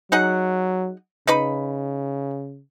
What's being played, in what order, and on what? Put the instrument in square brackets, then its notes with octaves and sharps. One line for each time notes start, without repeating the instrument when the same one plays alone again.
[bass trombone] F#3 [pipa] D#4 G#4 F#5
[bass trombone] C#3 [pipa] D#4 B4 B5